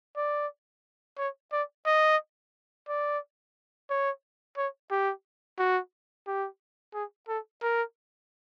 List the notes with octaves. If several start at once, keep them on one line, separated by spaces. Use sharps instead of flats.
D5
C#5
D5
D#5
D5
C#5
C#5
G4
F#4
G4
G#4
A4
A#4